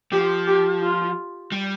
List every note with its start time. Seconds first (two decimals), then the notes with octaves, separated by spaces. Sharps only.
0.12 F3 G4
0.47 G4
0.83 F4
1.52 G3